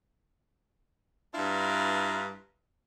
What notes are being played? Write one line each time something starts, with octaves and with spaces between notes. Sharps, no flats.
G2 D4 E4 F4 B4 A#5